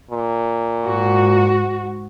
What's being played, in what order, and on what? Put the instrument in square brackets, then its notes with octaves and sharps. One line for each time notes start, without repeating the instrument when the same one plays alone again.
[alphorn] A#2
[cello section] G#2 F#4